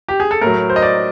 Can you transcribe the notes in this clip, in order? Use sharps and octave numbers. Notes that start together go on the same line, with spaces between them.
G4
G#4
A4
A2 F#3 A#4
C5
D#5
D5